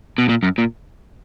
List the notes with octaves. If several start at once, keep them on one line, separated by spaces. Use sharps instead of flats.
B2
A#2
F#2
A#2